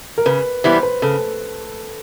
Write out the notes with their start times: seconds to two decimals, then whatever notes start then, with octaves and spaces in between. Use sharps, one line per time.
0.18 A#4
0.26 C#3 B4
0.64 E3 G3 B3 E4 C5
0.83 B4
1.02 C#3 A4